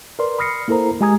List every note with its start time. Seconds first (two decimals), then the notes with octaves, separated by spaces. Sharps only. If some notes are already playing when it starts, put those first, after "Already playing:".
0.19 A#4 B4 D5 C6
0.39 B5 D#6 F6 A#6 C7 C#7
0.68 A#3 E4 A4 A#4 C5 A#5
1.01 G#3 G4 G#5 A#5 D#6 G#6